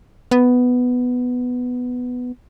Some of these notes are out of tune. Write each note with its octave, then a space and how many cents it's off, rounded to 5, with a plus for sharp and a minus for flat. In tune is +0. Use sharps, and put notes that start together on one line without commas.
B3 +5